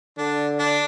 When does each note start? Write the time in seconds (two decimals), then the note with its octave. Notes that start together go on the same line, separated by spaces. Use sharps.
0.18 D3 D4
0.59 D4